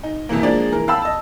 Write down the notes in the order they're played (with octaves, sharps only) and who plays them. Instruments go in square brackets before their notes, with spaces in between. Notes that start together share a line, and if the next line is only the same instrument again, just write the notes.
[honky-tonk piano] D#4
F2 C3 E3 A#3
F3 G#3 A#3 D4 G#4 D5
E3 A#4
F5 G5 A5 B5 E6
D#5 A5